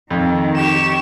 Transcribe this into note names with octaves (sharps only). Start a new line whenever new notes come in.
F2 D#3
G4 C#6 E7